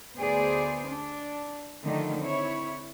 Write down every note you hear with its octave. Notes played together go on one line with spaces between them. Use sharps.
D2 B3 G#4 C5 D5
D4
D3 D#3 F3 A3 D#4
C4 E4 C#5